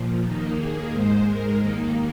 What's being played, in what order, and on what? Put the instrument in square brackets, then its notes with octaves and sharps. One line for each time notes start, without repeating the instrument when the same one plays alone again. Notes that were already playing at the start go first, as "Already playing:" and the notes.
Already playing: [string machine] A#2 F3
D#2 D#3 A#3 D#4
G#4
G#2 G#3 C5
A#4
D#2 D#3 A#3 D#4